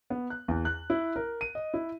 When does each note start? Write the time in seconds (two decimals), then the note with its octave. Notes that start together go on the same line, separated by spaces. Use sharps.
0.10 B3
0.30 F#6
0.48 E2
0.65 F#6
0.90 E4
1.16 A#4
1.41 D#7
1.55 D#5
1.74 E4